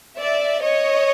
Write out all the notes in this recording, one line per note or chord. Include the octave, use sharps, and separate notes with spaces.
D5 E5
C#5 D#5